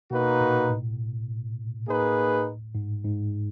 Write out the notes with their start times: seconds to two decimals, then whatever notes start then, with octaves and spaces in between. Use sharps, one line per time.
0.10 B2 A#3 D#4 F#4 B4
0.41 A#2
0.70 A2
1.87 A#3 D#4 G#4 B4
2.75 G#2
3.04 G#2